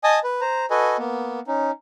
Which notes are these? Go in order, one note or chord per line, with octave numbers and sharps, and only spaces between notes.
D#5 G#5 A5 D#6
B4
C5 A#5
F#4 A4 B4 D#5 G#5
A#3 B3
C#4 D#4